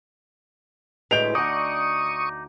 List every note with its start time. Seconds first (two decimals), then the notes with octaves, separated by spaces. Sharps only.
1.11 D2 A2 G#3 B4 G6 D7 F7
1.35 D2 D#4 D5 D#5 F#5 C#6 D#6